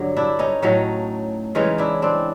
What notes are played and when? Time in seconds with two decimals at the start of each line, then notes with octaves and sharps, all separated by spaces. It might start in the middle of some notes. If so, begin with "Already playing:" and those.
Already playing: G2 D3 F#3
0.17 D4 E4
0.39 C#4 D#4
0.62 A2 F#3 A3 C#4 D#4
1.55 C#3 E3 G#3 C#4 D#4
1.78 D4 E4
2.02 C4 D4